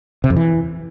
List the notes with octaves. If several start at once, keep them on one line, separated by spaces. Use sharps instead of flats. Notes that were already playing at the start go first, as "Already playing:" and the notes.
C3
F2
E3